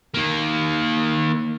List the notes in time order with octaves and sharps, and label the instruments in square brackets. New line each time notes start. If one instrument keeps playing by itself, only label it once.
[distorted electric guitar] D#3 A#3